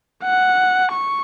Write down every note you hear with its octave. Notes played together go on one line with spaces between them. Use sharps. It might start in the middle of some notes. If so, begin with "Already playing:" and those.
F#5
C#6